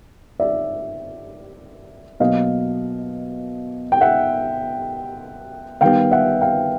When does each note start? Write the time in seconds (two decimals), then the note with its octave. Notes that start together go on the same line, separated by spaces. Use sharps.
0.40 D5 E5
2.20 B2 F#3 A#3 D#5 F5
3.92 G5
4.01 E5 F#5
5.81 D#3 G3 B3 F5 G5
6.12 E5 F#5
6.41 F5 G5